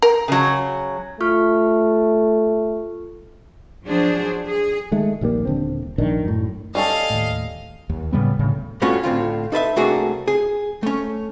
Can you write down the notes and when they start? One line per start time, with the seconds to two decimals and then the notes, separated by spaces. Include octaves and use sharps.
0.02 A#4
0.28 C#3 F#3
1.21 A3 F4 C#6 F6
3.85 F3 F#3 D4 G#4 C5
4.47 G#4
4.91 D#3 G#3 A3
5.21 A#1 D#2 G3 A#3
5.45 D#1 D3 C4
5.98 A#1 D#3 D4
6.25 F#2 A2
6.75 G3 C#4 A4 D#5 F5
7.10 D#2 A2
7.89 D#2
8.12 A2 C#3 G3 B3
8.39 D2 A2 C#3
8.82 G2 A3 B3 C#4 F4 F#4
9.03 A2 D3 C4 F4
9.52 D#4 A4 B4 E5
9.76 C2 A3 A#3 D4 F#4 G#4
10.28 G#4
10.83 A3 C#4